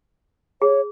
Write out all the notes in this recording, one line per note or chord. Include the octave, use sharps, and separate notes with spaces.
G#4 C#5